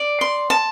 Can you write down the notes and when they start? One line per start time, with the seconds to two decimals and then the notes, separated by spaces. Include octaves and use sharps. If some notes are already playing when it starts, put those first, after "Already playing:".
Already playing: D5
0.21 C6
0.50 A5